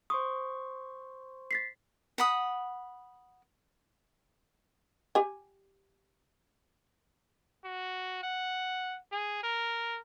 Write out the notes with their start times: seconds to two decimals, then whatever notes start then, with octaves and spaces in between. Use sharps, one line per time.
0.10 C5 C6 C#6 D#6
1.51 A6 B6 C7
2.18 F#5 B5 D#6
5.15 G4 G#5
7.64 F#4
8.23 F#5
9.12 G#4
9.43 A#4